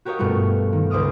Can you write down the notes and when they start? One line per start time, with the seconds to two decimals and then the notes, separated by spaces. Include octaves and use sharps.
0.05 F#4 G4 A#4 C#5 D#5 F5
0.19 G2 B2 A3 B3 F4
0.73 D#3
0.90 C#2 C5 D#5 D6 D#6 F6